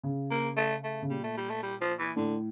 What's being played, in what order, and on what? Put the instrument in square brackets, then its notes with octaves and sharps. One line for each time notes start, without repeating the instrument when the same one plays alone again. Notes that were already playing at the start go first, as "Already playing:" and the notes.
[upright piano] C#3
[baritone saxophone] A#3
A3
A3
[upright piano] C#3
[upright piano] A#2 [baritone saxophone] G3
[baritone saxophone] A3
G3
A3
G3
F3
E3
[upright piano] A2 [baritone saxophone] D3